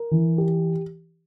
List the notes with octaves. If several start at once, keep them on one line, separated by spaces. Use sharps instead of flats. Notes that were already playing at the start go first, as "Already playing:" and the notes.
Already playing: A#4
E3
G4